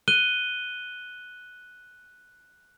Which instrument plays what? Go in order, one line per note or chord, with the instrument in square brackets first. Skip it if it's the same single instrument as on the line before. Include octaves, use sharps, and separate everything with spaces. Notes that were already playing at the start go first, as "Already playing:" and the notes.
[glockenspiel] F#6 D#7 G7